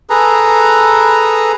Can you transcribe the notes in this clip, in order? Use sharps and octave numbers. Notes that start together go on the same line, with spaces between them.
G#4 A4 B4 A#5